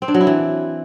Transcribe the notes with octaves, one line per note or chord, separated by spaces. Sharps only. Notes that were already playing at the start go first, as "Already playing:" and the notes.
C4
D4
F#3
E4
E3